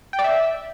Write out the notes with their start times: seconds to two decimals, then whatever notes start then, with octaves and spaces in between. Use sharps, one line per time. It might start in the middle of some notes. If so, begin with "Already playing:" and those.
0.13 G5
0.19 D5
0.24 E5